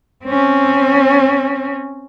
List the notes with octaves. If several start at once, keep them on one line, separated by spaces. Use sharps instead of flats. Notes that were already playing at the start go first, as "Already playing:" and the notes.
C4 C#4